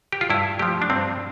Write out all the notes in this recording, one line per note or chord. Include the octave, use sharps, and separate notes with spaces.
G4
F4
G2 E4
F3 A3 G4
D4
G2 C4